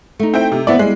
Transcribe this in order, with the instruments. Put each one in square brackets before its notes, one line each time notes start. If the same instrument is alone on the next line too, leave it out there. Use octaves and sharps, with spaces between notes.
[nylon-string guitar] A3 D#4
[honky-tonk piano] C4 E4 G5
C3
[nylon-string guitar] E3 B3 C4 [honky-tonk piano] E4 D5
[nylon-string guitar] G3 [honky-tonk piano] G#3